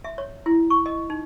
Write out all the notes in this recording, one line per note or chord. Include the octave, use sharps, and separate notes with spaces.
E5
C#5
E4
C#6
D#5
D#4